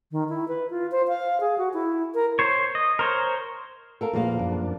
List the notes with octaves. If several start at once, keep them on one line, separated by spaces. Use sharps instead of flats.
D#3
E4
B4
F4
C5
F5
G#4
F#4
E4
A#4
C5 C#5
D#5
A#4 C5 C#5
A4 A#4 F5
E2 A#2 F3 A#3 F5
F#2 F3 D4